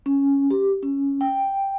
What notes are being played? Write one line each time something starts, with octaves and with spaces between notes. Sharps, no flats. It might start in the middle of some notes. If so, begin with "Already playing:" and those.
C#4
G4
C#4
G5